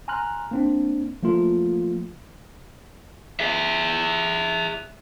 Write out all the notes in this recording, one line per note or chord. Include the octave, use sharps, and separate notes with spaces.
G#5 A#5 C6 F6 F#6
A#3 C4 D4
F3 A3 A#3 F4
G#4 E5